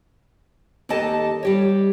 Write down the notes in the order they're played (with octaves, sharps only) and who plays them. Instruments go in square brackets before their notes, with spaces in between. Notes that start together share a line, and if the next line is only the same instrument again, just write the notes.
[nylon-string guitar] D#2 G4 A4 D#5 A5
G3 G4 C#5